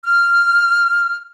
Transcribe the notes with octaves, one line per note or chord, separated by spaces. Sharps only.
F6